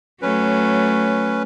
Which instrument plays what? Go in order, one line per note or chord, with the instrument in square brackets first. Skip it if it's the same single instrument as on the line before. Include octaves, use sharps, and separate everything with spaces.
[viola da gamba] F#3 A3 [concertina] C#4 B4